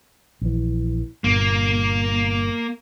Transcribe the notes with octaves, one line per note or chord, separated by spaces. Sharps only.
A#1 E3
G1 G2 A#2 A#3